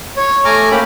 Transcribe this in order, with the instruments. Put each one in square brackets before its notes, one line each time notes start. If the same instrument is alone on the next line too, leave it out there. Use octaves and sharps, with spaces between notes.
[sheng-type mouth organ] C#5
A3 G#5 A#5 D6 F6
A#3 C#4 G4 B5